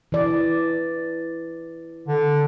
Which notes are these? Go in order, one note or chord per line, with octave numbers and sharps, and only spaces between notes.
E3 D5
D3